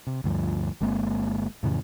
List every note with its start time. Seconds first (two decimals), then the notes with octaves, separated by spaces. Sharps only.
0.07 C3
0.24 D2 G2 F3
0.81 G1 G#3 A#3 C4
1.63 F2 A2 C#3 E3